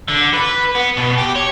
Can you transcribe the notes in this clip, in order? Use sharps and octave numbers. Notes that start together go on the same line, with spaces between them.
D3
B4
B3
B2
G4
C#5